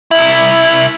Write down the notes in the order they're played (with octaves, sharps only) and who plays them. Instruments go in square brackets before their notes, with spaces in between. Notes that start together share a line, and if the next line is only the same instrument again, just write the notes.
[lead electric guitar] C2 E4